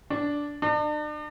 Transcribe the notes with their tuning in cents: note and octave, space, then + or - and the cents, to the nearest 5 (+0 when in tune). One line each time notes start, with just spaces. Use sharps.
D4 -10
D4 +40